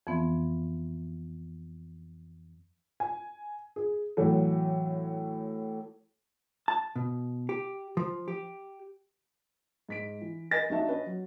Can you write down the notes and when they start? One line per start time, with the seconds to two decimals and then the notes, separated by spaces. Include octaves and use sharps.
0.07 F2 E3 F3 B3 C4
3.00 G#5
3.76 G#4
4.17 A2 E3 F#3 A3
6.68 A5
6.96 B2
7.49 G4
7.97 F3
8.28 G4
9.89 G#2 B6 D7
10.22 E3
10.51 A#4 B4 D#5 G#5 A6 A#6
10.70 A#1 D4 D#4 F#4 E5 A5
10.88 C#4 B4 D#5
11.06 F#3